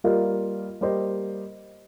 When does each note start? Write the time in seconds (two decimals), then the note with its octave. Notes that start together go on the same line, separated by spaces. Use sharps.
0.04 G3 A#3 F4 A#4 D#5
0.81 G3 A#3 G4 C5 D#5